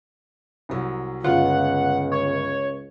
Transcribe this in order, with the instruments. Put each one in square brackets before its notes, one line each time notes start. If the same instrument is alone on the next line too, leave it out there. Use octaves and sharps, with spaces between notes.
[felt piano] C2 F#3
[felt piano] G1 [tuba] C#2 [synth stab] F4 [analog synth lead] F#5
[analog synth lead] C#5